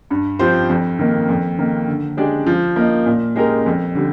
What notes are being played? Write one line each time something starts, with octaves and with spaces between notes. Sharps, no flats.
G2
F3 C4 G4 C5
F2
D#3 A#3
F2
D#3 A#3
D3
G#3 D4 G4 D5
F3
A#3 D#4
A#2
G#3 D#4 G4 A#4
F2
D3 G3